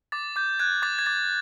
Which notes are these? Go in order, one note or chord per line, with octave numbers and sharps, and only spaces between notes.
D6 A6
D6 G6
F#6 G#6
D6 A6
G#6
D6 A6